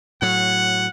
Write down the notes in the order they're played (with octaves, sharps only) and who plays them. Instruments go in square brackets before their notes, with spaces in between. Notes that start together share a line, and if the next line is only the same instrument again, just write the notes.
[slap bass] A2 F#3 [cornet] F#5